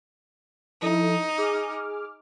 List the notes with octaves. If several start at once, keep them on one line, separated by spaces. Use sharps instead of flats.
F3 D#4 E4 A4
G#4 D6 F6